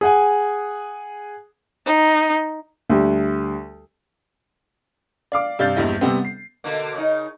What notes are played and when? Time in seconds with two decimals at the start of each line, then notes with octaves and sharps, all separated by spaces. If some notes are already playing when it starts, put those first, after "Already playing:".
0.01 G#4 F#5 G#5
1.85 D#4
2.90 D2 G3
5.32 D5 F5 D6
5.59 G2 C3 D5 F5 G6 A6
5.76 A#1 E2 G2 E4 D#5
6.01 C3 G3 B3 C4
6.25 C7
6.64 B2 D3 A#3
6.94 C#3 D#4